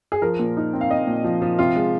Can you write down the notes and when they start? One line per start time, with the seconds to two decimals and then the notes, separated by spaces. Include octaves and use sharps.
0.12 G#4
0.22 F3 A#4
0.39 A#2
0.57 D#4
0.73 C4
0.81 F5
0.91 C4 D#5
1.07 A#2
1.24 F3
1.42 F3
1.59 C3 F4
1.76 G#3